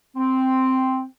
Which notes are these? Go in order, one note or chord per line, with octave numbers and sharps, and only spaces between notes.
C4